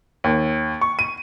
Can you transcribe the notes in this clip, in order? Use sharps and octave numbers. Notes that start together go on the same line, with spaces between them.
D#2
C#6
D#7